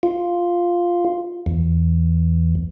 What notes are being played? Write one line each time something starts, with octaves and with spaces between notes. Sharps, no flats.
F4
E2